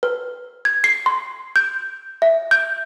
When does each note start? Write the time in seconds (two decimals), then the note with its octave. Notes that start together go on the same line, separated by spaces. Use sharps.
0.03 B4
0.65 G#6
0.84 C7
1.06 C6
1.56 G6
2.22 E5
2.51 G6